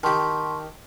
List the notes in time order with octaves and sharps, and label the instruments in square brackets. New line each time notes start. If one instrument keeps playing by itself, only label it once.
[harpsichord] D#3 G4 [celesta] A5 C6 C#6